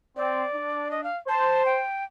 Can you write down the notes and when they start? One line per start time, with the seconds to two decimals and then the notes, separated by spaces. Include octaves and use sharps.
0.17 C4 D5
0.55 D4
0.91 D#5
1.04 F5
1.28 C5 A5
1.65 G5